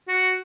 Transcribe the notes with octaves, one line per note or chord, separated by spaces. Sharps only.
F#4